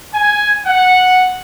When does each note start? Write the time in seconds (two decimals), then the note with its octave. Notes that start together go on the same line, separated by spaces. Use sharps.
0.13 G#5
0.65 F#5